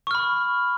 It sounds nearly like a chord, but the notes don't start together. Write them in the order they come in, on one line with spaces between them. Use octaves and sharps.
C#6 F6 B5